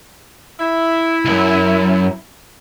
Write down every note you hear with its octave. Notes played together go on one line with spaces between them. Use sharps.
E4
C#2 F#2